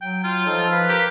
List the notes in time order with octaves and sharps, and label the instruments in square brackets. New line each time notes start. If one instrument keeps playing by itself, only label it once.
[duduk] F#3 [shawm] G5
[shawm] F4
[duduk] F3 [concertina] D#4 A4
[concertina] B4 F5 B5
[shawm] G4 [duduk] A#4